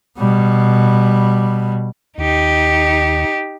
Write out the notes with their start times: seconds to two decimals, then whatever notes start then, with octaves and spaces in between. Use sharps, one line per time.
0.18 B2 G3
2.18 D#2 D#4 G4